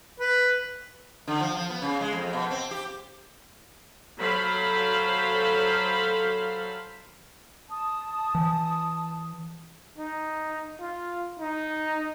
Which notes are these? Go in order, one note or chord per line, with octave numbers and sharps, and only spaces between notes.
B4
D3
F3
F3
B3
C#3
G#3
F2
B2
C4
G4
F#3 A4 C5 F5 B5
A5 D#6
E3
D#4
F4
D#4